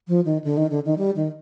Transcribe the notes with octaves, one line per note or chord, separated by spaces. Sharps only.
F3
D#3
D3
D#3
D3
D#3
G3
D#3